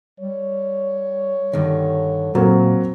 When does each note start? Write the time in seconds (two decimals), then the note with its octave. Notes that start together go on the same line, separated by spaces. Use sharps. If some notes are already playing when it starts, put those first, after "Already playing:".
0.20 G3 C#5
1.53 G2 D3 D#3
2.35 A#2 F#3 A#3 C4 A#4